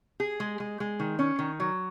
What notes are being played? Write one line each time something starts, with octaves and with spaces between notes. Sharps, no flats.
G#4
G#3
G#3
G#3
D#3
C#4
D#3
F#3